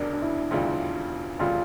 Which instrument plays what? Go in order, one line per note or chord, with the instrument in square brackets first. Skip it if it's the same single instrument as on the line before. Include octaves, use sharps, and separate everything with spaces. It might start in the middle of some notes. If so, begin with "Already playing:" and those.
Already playing: [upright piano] E1 D2 C#3 G3 [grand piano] D4 A#4
[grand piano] D4
E4
[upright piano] E1 D2 C#3 G3 [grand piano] F4
[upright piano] E1 D2 C#3 G3 [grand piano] F4